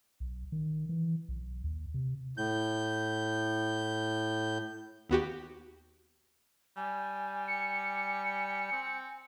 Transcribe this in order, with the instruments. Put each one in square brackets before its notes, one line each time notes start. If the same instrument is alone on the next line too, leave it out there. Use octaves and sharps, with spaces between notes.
[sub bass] B1
D#3
E3
B1
D#2
C3
[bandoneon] A2 G6
[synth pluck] D#2 B3 F#4 G4
[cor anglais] G3 [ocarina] G#5
[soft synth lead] C#7
[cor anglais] C4